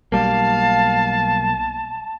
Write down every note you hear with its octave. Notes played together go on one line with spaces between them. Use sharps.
B1 G3 A#3 F5 A5